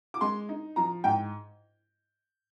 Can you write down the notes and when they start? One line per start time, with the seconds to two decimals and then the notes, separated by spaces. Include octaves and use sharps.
0.14 D6
0.21 G#3 C6
0.49 D#4
0.76 F3 A#5
1.04 G#2 G5